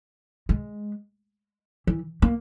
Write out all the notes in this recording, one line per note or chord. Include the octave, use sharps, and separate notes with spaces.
G#3
E3
A#3